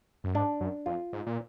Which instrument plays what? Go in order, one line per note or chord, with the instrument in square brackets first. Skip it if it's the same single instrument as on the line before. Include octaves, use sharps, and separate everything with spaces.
[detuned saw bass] F#2
[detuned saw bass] G#2 [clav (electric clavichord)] D4
[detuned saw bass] F#2
[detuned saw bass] F2 [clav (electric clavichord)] F4
[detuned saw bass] G#2
A#2